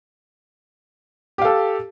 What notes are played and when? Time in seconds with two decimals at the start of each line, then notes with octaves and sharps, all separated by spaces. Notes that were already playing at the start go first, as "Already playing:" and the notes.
1.38 G4
1.42 F5
1.45 A4